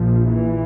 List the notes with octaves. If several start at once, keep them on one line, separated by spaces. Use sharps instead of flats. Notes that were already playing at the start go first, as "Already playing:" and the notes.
Already playing: A#1 A#2 F3
E3